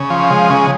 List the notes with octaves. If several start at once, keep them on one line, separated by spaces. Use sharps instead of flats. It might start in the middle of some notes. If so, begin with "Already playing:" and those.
Already playing: C#3
F3
G#3
C#3